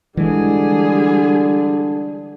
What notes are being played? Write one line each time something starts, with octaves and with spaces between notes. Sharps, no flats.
D3 E3 G3 G#3 G#4